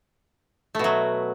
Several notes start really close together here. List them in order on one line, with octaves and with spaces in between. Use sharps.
A3 B2 F#3